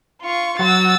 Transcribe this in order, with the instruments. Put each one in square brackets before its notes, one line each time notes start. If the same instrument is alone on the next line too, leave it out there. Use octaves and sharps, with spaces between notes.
[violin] F4 C#6
[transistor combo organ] F#3 [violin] E6 A6